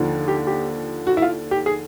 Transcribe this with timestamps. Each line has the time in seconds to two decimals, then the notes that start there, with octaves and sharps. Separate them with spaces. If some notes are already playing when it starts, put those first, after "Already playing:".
Already playing: D#2 D3 F3
0.28 G4
0.47 G4
1.07 F#4
1.17 E4
1.22 F4
1.51 G4
1.66 G#4